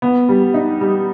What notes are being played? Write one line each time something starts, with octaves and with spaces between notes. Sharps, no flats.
B3
G3
D#4
G3